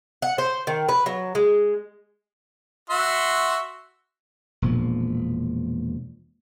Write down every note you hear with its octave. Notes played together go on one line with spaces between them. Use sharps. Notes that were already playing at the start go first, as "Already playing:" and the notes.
F#5
C5
D#3
B4
F#3
G#3
F#4 E5 C6
E1 A#2 F3